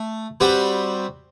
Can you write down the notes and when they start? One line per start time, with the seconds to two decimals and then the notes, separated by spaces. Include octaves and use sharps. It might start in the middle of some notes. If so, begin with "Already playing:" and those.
Already playing: A3
0.40 G3 C4 F#4 B4